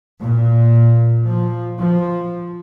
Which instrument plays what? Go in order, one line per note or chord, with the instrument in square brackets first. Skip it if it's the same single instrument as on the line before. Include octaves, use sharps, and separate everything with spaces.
[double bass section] A#2
F3
F3